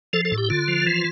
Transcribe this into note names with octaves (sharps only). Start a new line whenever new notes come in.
F3 A4
A4
A2
G4
D3 F4
F3
E3